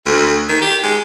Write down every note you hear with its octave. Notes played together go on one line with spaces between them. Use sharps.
D2
D#3
G4
G#3